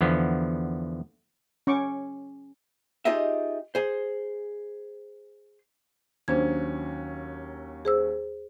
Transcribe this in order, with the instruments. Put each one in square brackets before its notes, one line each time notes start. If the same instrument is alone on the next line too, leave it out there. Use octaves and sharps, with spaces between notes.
[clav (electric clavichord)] E2 D3 F3 B3
[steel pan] C#4 C#6 D6
[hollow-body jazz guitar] D#4 F4 G4 G#4 D#5 E5
G#4 C5
[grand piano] D#2 F#3 C#4 [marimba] D4 C5 G#6
[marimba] G#4 C5 E6